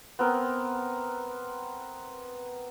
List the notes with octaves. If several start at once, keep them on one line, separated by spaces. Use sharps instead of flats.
B3 C4 A#4